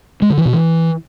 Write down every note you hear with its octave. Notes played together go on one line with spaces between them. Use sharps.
G#3
D3
E3
B2
E3